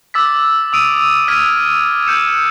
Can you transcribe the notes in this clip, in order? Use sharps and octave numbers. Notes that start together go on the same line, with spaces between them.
D6 E6 A6 B6
D#6 E6 D7 D#7 F7
F6 G#6 B6 D#7
E6 G6 C#7 E7